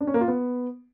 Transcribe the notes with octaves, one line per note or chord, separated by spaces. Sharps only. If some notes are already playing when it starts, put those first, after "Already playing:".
D4
C#4
A#3
F4
B3